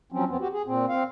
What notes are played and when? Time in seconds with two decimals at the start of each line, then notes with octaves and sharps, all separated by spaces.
0.12 F3 F#3 C4 C#4
0.28 F2 B3 C4
0.40 F#4 G4
0.53 G#4
0.66 A#2 C4
0.89 C4 F5